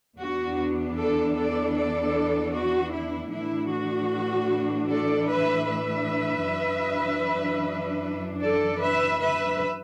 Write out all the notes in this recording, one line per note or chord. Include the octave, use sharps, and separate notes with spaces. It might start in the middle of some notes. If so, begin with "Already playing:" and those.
E2 E3 B3 D4 F#4
A4 D5
A4 D5
A4 D5
F#4
E4
A2 E3 D4 E4
F#4
A4 D5
B4 E5
B4 E5
F#2 E3 D4
A4 D5
B4 E5
B4 E5